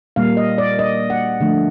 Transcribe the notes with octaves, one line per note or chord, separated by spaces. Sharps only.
A#2 G3 A#3 F5
D#5
D5
D#5
F#5
D3 F3 A3